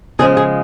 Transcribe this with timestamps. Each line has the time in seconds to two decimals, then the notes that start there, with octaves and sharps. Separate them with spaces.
0.19 C#3 F3 G#3 G#4
0.37 G#4